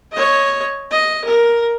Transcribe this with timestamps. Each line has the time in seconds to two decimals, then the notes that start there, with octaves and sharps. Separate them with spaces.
0.12 C#5 D#5
0.91 D#5
1.24 A#4